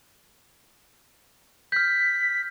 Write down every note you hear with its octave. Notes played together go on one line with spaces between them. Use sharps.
F6 G6 B6